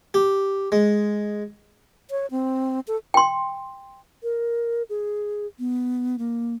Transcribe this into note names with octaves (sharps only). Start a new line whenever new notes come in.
G4
G#3
C#5
C4
A4
G5 C6
A#4
G#4
B3
A#3